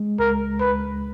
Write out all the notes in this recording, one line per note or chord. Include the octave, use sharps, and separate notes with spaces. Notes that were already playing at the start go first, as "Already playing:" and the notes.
Already playing: G#3
C#2 A#4
C#2 B4